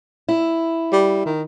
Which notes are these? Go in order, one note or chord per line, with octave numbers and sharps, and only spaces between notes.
E4
G3
D#3